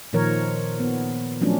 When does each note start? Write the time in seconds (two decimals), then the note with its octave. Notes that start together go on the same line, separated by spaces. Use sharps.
0.13 A#2 D#3 F3 A#4 C#5
0.80 B3
1.41 F3 F#3 A3 C#4 D4